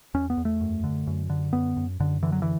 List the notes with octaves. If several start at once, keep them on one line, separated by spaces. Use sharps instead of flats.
E2 C#4
B3
E2
A3
F#2
D3
F#2
D3
F#2 B3
F#2
F#2 D3
D3 E3
F#3
E3